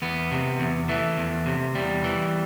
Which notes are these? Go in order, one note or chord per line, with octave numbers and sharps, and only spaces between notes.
E2 B3
C3
E2
E3 A3
E2
C3
E2 G3
E3